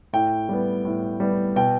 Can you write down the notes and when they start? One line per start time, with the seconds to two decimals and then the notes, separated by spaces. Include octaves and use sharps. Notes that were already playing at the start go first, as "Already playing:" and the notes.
0.13 A2 G5
0.49 G3 B3
0.85 A2
1.20 G3 B3
1.56 B2 G5